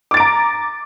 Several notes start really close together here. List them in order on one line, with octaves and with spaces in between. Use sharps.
D6 A6 D7 A#5